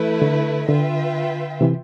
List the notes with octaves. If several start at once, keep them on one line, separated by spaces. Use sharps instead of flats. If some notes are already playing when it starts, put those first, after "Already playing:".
Already playing: E3 A3 E4 B4
D3
D3 F4 B4 E5 G5
C3 E3